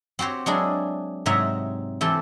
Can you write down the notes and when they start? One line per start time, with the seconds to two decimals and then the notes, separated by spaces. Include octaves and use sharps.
0.19 C4 F#4 G4 C5 C#5
0.46 F#3 G#3 D4 E4 G#4
1.26 G#2 C3 F#3 E5 A#5
2.01 E3 C4 G4 A4